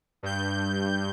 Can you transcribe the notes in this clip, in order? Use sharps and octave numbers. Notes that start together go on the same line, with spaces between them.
G2 G6